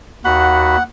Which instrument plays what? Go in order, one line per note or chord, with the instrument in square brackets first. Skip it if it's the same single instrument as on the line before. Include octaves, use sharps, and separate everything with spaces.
[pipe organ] D#2 F#4 B5 [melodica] F#5